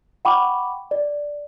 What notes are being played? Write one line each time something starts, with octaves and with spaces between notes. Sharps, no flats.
F#5 G5 B5 C#6 D6
D5